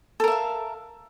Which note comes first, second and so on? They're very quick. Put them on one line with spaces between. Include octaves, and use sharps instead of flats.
A4 A#4 E5 F5